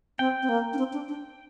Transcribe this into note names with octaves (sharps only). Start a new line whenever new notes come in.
C4 G5
C4
A#3
D4
C4
D4
D4